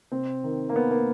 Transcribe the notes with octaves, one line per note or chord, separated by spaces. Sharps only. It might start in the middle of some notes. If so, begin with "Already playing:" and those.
C3 C4
D#3
A#3
C3 B3
A#3